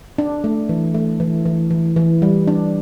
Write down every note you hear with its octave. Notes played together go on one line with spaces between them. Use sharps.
D4
A3
E3
A3
E3
E3
E3
E3
G3
D4